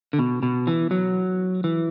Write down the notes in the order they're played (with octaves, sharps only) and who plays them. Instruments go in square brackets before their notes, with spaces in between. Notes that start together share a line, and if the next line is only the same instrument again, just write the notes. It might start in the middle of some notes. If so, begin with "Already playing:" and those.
[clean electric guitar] D3
B2
B2
E3
F#3
E3